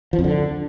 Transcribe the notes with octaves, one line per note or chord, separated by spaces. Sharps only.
F3
F2
D3